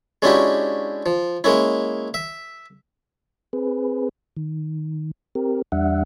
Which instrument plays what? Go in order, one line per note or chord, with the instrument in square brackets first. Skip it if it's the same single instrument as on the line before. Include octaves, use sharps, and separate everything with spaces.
[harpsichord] G#3 C#4 D4 E4 F#4 G4
F3
G#3 A#3 C#4 E4
E5
[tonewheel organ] C4 G#4 B4
D#3
C4 G4 A#4
E2 G3 D4 E5 F#5